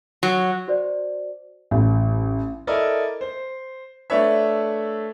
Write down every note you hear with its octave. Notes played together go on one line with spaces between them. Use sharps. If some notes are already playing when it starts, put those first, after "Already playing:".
F#3
F#4 C5 D5
A1
E4 A4 A#4 D5 D#5
C5
A3 D4 B4 C#5 E5